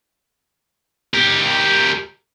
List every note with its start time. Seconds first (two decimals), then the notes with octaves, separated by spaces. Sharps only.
1.14 G4 A#4